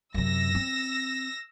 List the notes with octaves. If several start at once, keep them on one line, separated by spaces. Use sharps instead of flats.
F#2 C3 E6 A#6
C4